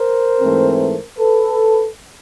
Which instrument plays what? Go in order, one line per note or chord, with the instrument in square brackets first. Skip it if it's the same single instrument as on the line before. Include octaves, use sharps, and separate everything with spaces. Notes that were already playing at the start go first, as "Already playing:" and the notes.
Already playing: [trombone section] A#4 C5
G#2 E3 A3 C4
A4 B4